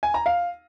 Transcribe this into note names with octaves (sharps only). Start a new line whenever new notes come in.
G#5
A#5
F5